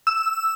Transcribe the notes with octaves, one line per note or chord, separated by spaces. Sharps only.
E6